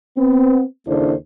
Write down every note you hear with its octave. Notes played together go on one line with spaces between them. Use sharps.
B3 C4
D#2 C#3 D4 E4 A4 C5